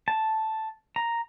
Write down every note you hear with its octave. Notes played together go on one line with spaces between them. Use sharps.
A5
A#5